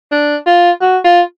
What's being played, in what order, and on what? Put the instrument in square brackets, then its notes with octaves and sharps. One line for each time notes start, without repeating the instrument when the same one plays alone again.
[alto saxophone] D4
F4
F#4
F4